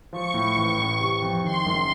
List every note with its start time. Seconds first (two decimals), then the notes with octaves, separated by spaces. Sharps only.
0.12 F3 C#6
0.34 A2
0.56 A1
0.78 A1
1.00 C3
1.22 F2
1.44 D#3 C6
1.66 F#1